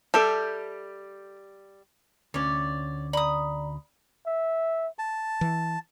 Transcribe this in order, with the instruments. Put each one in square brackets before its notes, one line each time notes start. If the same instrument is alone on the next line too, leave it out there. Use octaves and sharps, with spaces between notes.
[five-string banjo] G3 G4 E5 [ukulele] A4 A5
[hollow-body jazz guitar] D2 C#4 [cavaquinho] C#5 D5
[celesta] D5 A#5 [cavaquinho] B5 D#6
[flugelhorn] E5
[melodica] A5
[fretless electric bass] E3